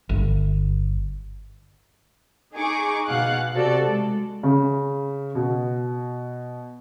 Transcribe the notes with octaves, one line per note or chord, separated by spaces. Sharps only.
G1
D#4 G#4 G#5 C#6 D6
B2 F5 F#5 F#6
C3 F#4 A4 D5
G#3
C#3
B2